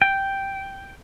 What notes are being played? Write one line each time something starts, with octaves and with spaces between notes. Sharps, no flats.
G5